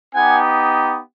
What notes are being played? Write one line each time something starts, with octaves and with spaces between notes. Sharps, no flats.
B3 D#4 G4 F#5 G#5